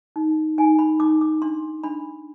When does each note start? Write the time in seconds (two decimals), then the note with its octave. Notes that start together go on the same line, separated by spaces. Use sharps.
0.16 D#4
0.58 D#4 G#5
0.79 B5
1.00 D#4 D6
1.21 D6
1.42 D4 C6
1.84 D4 B5